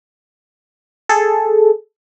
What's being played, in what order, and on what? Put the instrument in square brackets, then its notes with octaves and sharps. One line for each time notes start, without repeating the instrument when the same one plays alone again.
[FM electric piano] G#4 A4